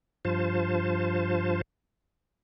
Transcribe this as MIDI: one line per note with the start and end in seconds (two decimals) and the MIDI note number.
0.25 1.61 43
0.25 1.61 53
0.25 1.61 65
0.25 1.61 72
0.25 1.61 81